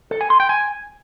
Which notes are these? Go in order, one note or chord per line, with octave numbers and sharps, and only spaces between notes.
A4
G#5
C6
G5
G#5